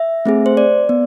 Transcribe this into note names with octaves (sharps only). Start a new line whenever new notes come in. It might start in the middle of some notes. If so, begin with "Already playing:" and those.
Already playing: E5
A3 C4 G#4
C5
D5
B3